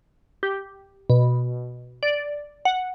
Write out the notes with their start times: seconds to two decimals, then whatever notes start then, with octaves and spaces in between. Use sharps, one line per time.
0.43 G4
1.10 B2
2.03 D5
2.65 F#5